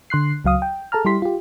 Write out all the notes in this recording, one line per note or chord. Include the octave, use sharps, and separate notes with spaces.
D3 C6 F#6 C7
C#2 F#3 F5 D#6
G5
G#4 A4 A5 A#5 F6
G3 E4 G4 C6 B6
F4 G4